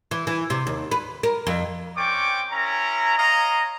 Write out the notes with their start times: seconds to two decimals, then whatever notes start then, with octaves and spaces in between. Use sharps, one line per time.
0.11 E3
0.27 E3
0.50 C3
0.67 D#2
0.91 B4
1.23 A#4
1.47 F2
1.97 C4 C#4 D5 G5 C#6 D6
2.51 C#4 E4 A#4 A#5
3.18 C#5 D#5 F5 A#5